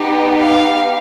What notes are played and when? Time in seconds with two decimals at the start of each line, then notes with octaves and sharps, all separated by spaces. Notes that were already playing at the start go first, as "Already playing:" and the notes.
Already playing: B3 D#4 G4
0.38 F5